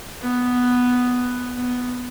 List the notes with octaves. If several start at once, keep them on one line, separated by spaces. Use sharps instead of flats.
B3
B3